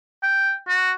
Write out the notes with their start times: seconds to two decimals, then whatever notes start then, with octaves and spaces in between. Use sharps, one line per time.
0.23 G5
0.68 F#4